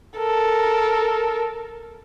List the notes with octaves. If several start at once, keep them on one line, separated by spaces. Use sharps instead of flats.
A4 A#4